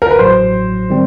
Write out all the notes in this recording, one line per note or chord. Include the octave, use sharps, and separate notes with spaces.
A#4
B4
A1 A2 F#3 C5
D#3 G3 C4